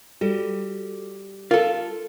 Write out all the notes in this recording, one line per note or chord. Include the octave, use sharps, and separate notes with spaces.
G3 F4 F#4 A4
F4 A4 A#4